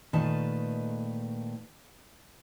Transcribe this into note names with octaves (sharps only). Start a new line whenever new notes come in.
A#2 D#3 A3 B4 D#5 A5